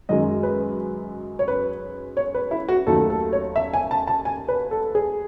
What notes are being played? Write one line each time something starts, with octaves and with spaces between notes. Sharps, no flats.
F#2 D#3 G#3 D#5
B4
C#5
B4
C#5
B4
E4
F#4
D#2 D#3 F#3 A3 A4
A4
C#5
E5
G#5
A5
A5
G#5
B4
A4
G#4